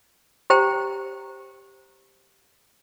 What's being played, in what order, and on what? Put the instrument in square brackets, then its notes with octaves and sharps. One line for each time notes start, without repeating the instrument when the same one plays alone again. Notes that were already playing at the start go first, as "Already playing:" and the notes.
[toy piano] G4 C5 G5 A#5